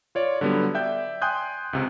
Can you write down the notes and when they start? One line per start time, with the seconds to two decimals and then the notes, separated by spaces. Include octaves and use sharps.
0.15 F4 C#5 D5
0.41 D3 F#3 G3 B3
0.74 D5 E5 G5 G6
1.22 G5 G#5 C6 D#6 F#6 G6
1.73 C#2 C3